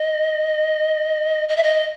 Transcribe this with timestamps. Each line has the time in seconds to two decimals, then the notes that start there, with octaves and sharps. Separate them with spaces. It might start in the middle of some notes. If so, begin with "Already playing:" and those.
Already playing: D#5
1.49 D#5
1.57 E5
1.63 D#5